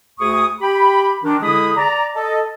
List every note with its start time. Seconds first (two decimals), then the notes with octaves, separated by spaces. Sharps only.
0.19 D2 G#4 C#6 D#6
0.61 G4 G5 B5
1.24 D#3 D4
1.42 D3 G#3 E4 G#4 B5 D#6
1.77 D5 A#5
2.15 A4 D#5